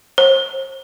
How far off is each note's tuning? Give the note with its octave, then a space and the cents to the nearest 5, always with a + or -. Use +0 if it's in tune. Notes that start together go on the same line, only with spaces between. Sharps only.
C5 +35